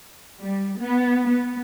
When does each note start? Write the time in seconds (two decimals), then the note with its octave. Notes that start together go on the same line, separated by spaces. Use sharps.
0.40 G3
0.79 B3
1.27 B3